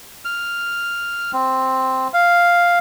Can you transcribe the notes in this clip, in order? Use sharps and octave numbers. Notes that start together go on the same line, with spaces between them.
F6
C4
F5